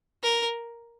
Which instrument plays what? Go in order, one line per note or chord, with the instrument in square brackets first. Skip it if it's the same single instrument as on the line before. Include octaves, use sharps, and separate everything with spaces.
[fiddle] A#4